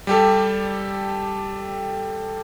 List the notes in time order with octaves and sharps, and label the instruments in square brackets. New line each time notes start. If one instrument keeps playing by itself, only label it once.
[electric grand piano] G3 G4 A4